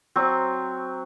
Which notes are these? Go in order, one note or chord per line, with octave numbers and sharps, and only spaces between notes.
F#3 C4 C#6